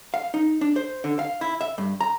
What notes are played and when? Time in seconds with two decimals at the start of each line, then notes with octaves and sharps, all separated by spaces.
0.14 F5
0.34 D#4
0.61 D4
0.76 C5
1.04 D3
1.19 F5
1.41 E4
1.61 E5
1.78 G2
2.01 A#5